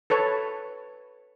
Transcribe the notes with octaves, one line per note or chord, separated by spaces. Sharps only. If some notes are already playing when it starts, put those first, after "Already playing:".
A4 B4 C#5 A5